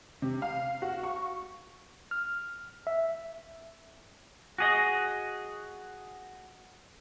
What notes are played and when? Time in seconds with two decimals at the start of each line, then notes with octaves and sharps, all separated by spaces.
0.22 C3
0.42 F5
0.82 F#4
1.03 C#6
2.11 F6
2.87 E5
4.58 F#4 G#4 D#5